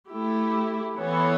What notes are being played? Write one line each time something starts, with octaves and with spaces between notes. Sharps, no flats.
A3 E4 G4
E3 B3 E4 A4 C#5